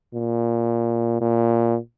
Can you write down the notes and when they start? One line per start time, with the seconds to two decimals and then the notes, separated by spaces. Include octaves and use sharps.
0.15 A#2
1.21 A#2